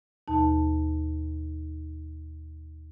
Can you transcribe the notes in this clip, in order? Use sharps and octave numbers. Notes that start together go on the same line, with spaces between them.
D#2 B2 D#4 A5